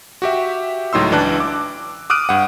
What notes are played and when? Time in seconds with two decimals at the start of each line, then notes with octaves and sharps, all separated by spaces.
0.22 F#4 G4 E5
0.93 C#2 A2 F#3 D#4 C6 E6
1.12 C#2 E3 D4 D5 A5 F#6
1.40 D6
2.10 D6 D#6 F6 F#6 D7 D#7
2.29 G2 F#5